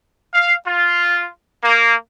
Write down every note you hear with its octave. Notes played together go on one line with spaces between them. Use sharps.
F5
F4
A#3